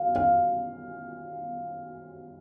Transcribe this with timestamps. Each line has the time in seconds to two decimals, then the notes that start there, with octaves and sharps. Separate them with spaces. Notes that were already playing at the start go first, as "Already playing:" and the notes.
Already playing: F5
0.16 F5